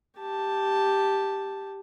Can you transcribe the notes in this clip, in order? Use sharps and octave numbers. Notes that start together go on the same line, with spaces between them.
G4 A5